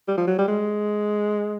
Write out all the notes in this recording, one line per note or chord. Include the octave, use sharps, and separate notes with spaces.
G3
F3
F#3
G3
G#3